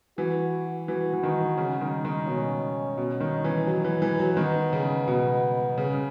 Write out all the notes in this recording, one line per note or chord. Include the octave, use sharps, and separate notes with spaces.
E3 F#4
E3 F#4
E3
D#3
C#3
D#3
D#3
B2 C#4
B2
D#3
E3
F#3
E3
E3
F#3
D#3 B3
C#3
B2
C#3
C#3